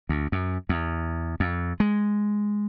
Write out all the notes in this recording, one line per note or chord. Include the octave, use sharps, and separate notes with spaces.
D2
F#2
E2
F2
G#3